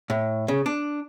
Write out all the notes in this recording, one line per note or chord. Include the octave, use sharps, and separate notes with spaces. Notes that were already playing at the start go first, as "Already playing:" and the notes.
A2
C#3
D4